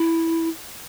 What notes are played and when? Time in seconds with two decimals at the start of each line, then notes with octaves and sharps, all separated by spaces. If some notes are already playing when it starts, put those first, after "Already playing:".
Already playing: E4